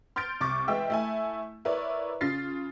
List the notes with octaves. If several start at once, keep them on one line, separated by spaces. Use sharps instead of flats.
C6 F6 G6 A6 D7
C2 C#6 D6 A6
E3 G#3 E5 G5 E6
A3 E4 G#5
E4 A#4 B4 C#5 D5
C#3 F4 A6 C7